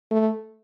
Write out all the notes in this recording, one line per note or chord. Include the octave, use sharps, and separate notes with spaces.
A3